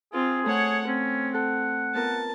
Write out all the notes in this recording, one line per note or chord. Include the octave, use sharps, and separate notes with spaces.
C4 F4 G#4
A3 C#5 F#5
C4 C#4
A4 F#5
B3 F4 A#4 A5